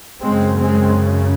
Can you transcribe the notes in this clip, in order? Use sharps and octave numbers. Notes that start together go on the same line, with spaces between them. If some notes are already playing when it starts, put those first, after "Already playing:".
F#2 C#3 G#3 C4
G#3 C4